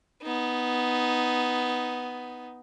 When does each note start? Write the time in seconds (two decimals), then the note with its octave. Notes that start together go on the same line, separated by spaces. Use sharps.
0.22 B3 D#4